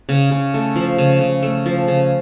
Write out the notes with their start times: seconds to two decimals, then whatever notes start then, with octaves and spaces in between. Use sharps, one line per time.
0.09 C#3
0.31 C#3
0.54 A3
0.76 F3
0.98 C#3
1.20 C#3
1.43 A3
1.66 F3
1.88 C#3